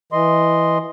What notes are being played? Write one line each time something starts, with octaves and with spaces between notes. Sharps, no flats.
E3 D#5 C6